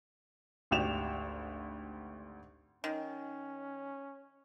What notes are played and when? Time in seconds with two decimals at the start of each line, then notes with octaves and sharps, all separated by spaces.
0.71 G#1 D2 G4 E7 F7
2.84 D#3 C#4